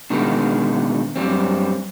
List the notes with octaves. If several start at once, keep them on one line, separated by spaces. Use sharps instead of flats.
B2 D3 D#3 G#3
F#2 G3 C4